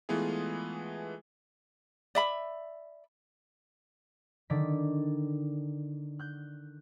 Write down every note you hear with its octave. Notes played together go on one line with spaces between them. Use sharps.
E3 G#3 A3 B3 F4 G#4
D5 E5 B5
D3 D#3 D5 B6
F#6 G6